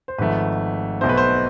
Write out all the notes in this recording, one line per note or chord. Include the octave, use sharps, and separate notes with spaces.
C5
G#1 G#2 F3 A3 B4
B1 B2 A3 C5
B4
C5